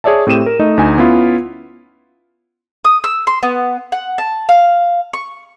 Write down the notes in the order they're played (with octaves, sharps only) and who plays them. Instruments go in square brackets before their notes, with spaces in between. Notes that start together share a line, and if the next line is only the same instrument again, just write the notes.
[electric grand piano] G#4 C#5 D5 E5 A5
A2 C4 G4 D#7 E7
A#4
A3 D#4 D#5
D2 D#4 G#5
B3 C#4 E4 F4
[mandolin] D#6
E6
C6
B3
F#5
A5
F5
C#6